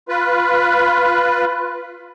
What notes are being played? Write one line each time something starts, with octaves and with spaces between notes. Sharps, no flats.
F4 B4